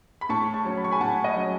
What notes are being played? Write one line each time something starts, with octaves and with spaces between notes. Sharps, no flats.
B5
A2 A5 C#6
A5 C#6
F#3 C#4
B5
C#6
G#5 B5
A2 F#5 A5
D#5 F#5
F#3 C#4